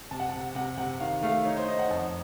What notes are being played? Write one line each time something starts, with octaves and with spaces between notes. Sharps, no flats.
C3 A5
F#5
C3 A5
C3 F#5
C3 F#5
D#3 F5
A3 F5
D#4 C#5
C5
D#4 D#5
F#5
F2 A5